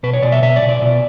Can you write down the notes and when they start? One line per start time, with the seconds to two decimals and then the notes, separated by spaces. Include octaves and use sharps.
0.03 B2 B4
0.13 C#5
0.22 B2 D5
0.32 E5
0.43 B2 E5
0.56 D5
0.62 B2
0.69 D5
0.82 B2